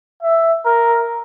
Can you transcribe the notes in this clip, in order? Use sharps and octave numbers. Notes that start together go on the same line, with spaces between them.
E5
A#4